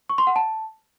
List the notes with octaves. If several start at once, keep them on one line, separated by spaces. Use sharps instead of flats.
C#6
C6
F#5
A5